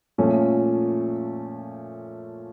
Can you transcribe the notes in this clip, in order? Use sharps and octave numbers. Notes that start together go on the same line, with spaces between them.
A#2 F3 A3 C#4